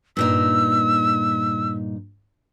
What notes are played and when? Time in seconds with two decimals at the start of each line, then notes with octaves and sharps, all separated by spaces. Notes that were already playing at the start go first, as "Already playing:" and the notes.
0.17 G2 A#2 D#4 E6